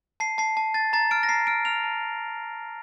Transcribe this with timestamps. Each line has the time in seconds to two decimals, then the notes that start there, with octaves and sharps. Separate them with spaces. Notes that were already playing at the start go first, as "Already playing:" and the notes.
0.20 A5 C7
0.38 A5 C7
0.57 A5
0.74 A5 A6
0.93 A#5 A6
1.11 F6 D7
1.23 A#6
1.29 A#5 C7
1.47 F6 D7
1.65 F6 F7
1.83 A5